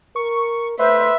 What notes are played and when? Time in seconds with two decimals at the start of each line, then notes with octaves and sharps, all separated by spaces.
0.16 A#4 C#6
0.79 A3 B4 C5 E5